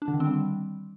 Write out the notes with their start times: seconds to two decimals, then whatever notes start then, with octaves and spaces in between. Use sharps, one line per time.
0.02 D4
0.08 D3
0.14 D#3
0.20 C4
0.26 G3